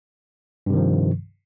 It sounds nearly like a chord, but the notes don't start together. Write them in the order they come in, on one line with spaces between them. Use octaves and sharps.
G2 C3 D#3 F3